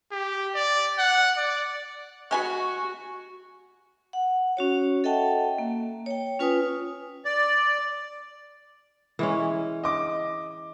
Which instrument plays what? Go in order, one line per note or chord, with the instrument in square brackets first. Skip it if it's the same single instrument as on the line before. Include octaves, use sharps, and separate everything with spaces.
[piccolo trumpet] G4
D5
F#5
D5
[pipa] G#3 G#5 B5 [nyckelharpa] F#4 [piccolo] C#6
[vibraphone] F#5
C#4 F#4 C#5
A4 D#5 E5 F#5 G5 A5
A#3
C#5 G5
C#4 F4 B4 G#5 D#6
[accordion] D5
[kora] E3 G#3 C#4
[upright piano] D#5 D6